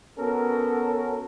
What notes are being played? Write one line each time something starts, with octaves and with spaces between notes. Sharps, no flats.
B3 C#4 F#4 A4 A#4